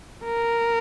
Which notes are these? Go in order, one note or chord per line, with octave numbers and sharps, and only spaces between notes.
A#4